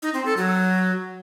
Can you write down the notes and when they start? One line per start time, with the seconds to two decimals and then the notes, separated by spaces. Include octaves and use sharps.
0.02 D#4
0.14 C4
0.25 A4
0.37 F#3